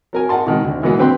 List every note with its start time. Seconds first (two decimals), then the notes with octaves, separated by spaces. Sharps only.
0.13 F#3 A#4 G#5
0.29 A#4 D#5 F#5 A5 C6
0.47 B2 D#3 G#3
0.64 D2
0.83 B2 E3 F#3 G#3 A#3 B3
0.97 D3 F#3 C4 B4 G5 C6